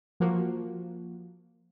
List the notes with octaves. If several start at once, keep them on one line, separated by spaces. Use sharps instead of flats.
F3 A#3 F#4